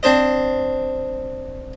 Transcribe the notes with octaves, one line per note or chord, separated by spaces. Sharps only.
C4 D4 C5 D#5